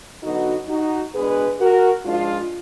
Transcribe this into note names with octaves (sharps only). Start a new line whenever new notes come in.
D3 F#3 B3 D#4 F#4
D#4 F#4
B2 G#3 D4 G#4 B4
F#4 A#4
G#2 F3 G#3 D4 F4